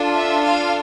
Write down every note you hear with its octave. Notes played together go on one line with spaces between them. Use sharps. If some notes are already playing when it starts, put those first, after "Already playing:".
Already playing: D4 F4 A4
E5
F5